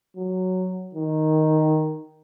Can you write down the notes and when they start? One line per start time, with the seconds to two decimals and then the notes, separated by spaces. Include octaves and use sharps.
0.17 F#3
0.95 D#3